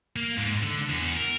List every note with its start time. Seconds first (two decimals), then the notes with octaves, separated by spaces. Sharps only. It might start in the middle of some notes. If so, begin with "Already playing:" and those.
0.16 A#3
0.38 G#2
0.63 D3
0.89 E2
1.17 A#4